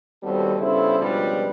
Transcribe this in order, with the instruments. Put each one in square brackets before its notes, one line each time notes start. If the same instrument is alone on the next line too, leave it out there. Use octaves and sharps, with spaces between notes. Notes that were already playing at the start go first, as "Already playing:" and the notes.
[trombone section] D#2 G3 B3 C4 F#4 A4
G2 C#3 B3 E4 A4 C5
C#2 B2 F3 G3 D4 B4